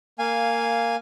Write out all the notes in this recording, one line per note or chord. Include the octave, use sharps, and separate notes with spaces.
A#3 F5 G#5